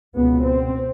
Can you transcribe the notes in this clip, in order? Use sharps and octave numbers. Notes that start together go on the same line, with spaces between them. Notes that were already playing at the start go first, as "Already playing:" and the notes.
C#2 B2 B3
C4